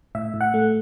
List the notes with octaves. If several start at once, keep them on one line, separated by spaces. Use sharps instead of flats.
A2 E5
A2
F#5
A3